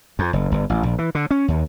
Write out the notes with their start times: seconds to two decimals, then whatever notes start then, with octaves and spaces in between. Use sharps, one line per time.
0.19 F2
0.33 F#1
0.52 G1
0.70 A1
0.83 A#1
0.98 E3
1.15 D3
1.31 C#4
1.48 D#2